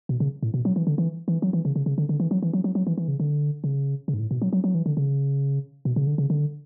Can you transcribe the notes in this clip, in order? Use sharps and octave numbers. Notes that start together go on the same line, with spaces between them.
B2
C#3
A2
B2
F#3
E3
D3
E3
E3
F#3
E3
C#3
C#3
C#3
D3
D3
E3
F#3
E3
F#3
F#3
F#3
E3
E3
C#3
D3
C#3
C#3
G#2
A2
B2
F#3
F#3
F#3
E3
D3
C#3
B2
C#3
D3
C#3
D3